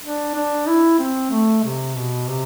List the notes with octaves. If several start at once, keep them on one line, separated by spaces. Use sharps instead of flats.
D4
D4
E4
C4
A3
C3
B2
C3